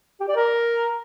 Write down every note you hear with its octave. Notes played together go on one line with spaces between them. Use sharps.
G4
D5
A#4